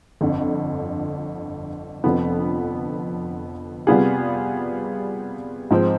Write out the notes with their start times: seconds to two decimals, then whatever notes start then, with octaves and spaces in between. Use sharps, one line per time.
0.21 G1 F2 D3
2.04 F1 F2 D3 F3 B3
3.87 C3 G3 B3 F4 G#4
5.71 G#2 F3 C4